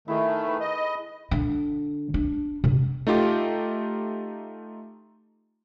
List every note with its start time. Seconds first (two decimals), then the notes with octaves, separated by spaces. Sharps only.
0.08 D#3 A3 E4 G#4 A#4
0.21 A#5
0.47 B4
0.60 D#5
1.31 D3
2.14 D4
2.64 C3
3.07 A3 D#4 F4 G4